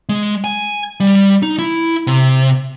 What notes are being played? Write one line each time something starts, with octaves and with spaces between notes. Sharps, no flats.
G#3
G#5
G3
D#4
E4
C3